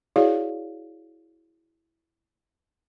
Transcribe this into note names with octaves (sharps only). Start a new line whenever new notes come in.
E4 F#4 G#4 C#5 D5 F5